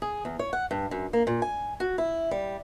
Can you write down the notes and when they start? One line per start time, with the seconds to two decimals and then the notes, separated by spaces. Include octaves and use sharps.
0.02 G#4
0.25 E2
0.39 C#5
0.53 F#5
0.71 G2
0.91 F#2
1.13 A#3
1.27 A#2
1.42 G#5
1.80 F#4
1.98 E4
2.31 G3